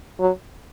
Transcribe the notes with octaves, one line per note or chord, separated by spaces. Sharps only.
F#3